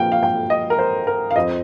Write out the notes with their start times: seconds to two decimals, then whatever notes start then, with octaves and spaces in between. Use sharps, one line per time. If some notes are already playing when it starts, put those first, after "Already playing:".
Already playing: A#2 F3 A#3 F5 G5
0.12 F5
0.23 G5
0.50 D#5
0.70 A#4
0.79 C5
1.07 A#4
1.31 F5
1.36 F2 F3 C4 D#5